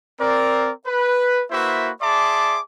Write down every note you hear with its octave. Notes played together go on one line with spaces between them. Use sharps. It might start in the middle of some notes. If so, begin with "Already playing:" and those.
C4 A#4 D5
B4
A#3 E4 F#4 B4 C5 E5
G#4 D5 E5 A5 C6 D6